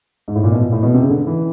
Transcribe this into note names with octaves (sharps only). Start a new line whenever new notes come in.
G#2
A2
A#2
B2
A#2
A2
B2
C3
C#3
D3
E3